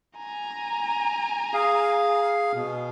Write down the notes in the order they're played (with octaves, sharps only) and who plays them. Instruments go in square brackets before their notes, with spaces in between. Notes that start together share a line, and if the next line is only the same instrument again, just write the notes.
[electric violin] G#5 A#5
[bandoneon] G#4 F5
B2